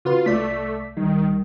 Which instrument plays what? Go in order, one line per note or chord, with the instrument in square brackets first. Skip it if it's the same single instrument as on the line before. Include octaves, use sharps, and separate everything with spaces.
[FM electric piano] C#3 F#4 B4 [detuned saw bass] F4
[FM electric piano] C2 D5 B6 [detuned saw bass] A3
[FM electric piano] B1 G3 [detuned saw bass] D#3